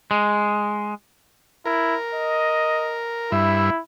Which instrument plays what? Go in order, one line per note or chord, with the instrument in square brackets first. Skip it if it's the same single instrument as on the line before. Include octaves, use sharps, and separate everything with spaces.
[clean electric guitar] G#3
[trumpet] E4 [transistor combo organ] A#4
[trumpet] D#5
[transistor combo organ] G2 E5 [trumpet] E4